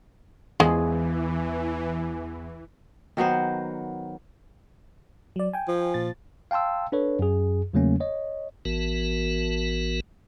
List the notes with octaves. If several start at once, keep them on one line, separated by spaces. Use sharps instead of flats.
E2 E3 F3 G#3 G#4
D#3 F#3 B3 C5
F#3 D5
G5 G#5
F3
A#2 A6
F5 G5 A5 C6 E6
D4 A4 B4 C#5
F#2 G#4
E2 C#3 F#3 A3 A#3 C#4
C#5 D#5
A1 E3 B3 F#4 A#4